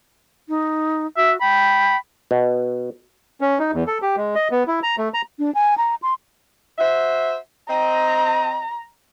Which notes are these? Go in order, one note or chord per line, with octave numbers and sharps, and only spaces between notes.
D#4
F#4 E5
G5 B5
B2
C#4
D#4
E2
A4
G4
G#3
D#5
B3
E4
A#5
A3
A#5
D4
G#5
A#5
C6
F#4 C5 E5
C4 D#5 A#5